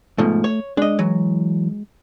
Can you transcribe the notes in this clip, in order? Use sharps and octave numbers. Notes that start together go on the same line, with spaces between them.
G#2 B2 F3 A3
C#5
G#3 D4 D#5
E3 F#3